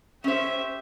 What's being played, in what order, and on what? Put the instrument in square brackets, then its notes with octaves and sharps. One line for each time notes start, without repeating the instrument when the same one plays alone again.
[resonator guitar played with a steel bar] C#4 C5 [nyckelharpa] G4 E5